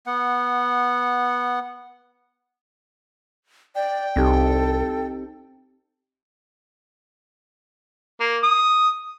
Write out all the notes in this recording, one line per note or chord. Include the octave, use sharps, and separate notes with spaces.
B3 F#5
D5 G5
C2 C4 D#4 G4 A4
A#3
D#6